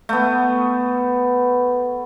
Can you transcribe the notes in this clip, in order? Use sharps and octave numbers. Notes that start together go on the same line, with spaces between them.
A3 B3